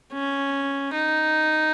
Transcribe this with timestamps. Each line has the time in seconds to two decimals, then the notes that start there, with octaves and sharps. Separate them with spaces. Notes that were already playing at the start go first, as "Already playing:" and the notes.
0.13 C#4
0.93 D#4